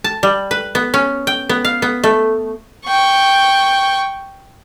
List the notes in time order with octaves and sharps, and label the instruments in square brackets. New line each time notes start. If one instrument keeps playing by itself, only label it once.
[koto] A5
G3
B4
B3
C#4
G5
B3
F5
B3
A3
[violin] G5 C#6